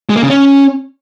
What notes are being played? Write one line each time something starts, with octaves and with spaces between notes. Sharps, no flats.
G#3
A#3
C#3
C#4